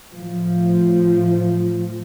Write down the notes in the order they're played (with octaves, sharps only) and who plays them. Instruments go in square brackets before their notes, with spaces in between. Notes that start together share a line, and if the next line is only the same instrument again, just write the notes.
[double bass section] A2 F3